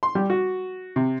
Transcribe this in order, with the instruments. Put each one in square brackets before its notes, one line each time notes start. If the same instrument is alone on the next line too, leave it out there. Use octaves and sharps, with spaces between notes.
[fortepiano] C6
G3
F#4
C3